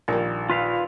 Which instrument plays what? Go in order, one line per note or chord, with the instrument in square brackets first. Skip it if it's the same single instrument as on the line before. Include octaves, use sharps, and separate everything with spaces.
[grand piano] A#1 [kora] D#3 G3 A#3
[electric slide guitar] F4 B4 F5